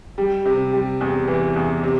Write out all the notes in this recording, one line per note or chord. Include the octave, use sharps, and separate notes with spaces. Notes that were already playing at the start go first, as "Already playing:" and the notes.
G3
C3
G3
E2
E3
E2
C3